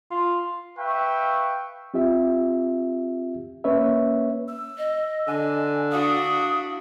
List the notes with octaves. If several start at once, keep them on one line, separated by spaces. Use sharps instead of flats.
F4
B4 E5 F5 G5 C#6
C4 F4 G4 E5
A#3 C#4 B4 C#5 E5
E6
D#5
D3 G#5
D4 E4 F#4 F5 D#6